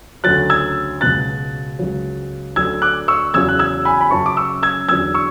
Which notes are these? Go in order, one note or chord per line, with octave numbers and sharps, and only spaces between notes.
D2 C#3 F#3 F#6 A6
E6 G#6
C#2 B2 F#3 F#6 A6
C#2 C#3 F#3
D2 D3 F#3 E6 G#6
D6 F#6
C#6 E6
E2 C#3 F#3 E6 G#6
F#6
E6 G#6
G#5 B5
B5
F#2 C#3 F#3 A5 C#6
D6
C#6 E6
E6 G#6
E2 D3 F#3 E6 G#6
C#6 E6